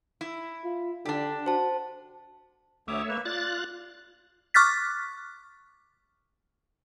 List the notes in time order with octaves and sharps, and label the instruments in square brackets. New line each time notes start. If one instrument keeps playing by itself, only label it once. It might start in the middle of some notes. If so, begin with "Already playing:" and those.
[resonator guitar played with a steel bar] E4
[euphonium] F4
[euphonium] D3 [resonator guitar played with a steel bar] D4 G4
[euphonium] F#4 [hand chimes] C5 A5
[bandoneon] D2 D6 D#6 [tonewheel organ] A3 C#5 E5
[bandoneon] A#3 B4
[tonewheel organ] F4 F#6 A6 [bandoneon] D5
[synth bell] C#6 D6 F6 F#6 A6 B6